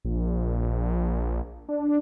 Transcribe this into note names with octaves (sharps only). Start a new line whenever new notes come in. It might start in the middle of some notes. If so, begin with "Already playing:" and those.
A#1
D4